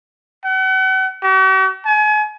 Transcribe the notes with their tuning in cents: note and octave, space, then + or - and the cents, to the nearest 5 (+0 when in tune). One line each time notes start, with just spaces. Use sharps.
F#5 +40
F#4 +45
G#5 +35